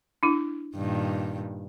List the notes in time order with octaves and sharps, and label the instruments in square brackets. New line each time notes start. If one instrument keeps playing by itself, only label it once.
[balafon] D4 E4
[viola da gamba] G2 A#2 D#3